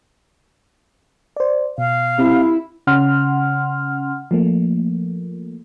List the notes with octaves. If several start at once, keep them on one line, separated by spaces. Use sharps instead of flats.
C5 D5
B2 F5
C3 E4
C#3 C#4 F#5 C6 F6
F3 A3 A#3